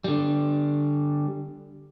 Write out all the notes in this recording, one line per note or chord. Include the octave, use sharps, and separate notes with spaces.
D3 G3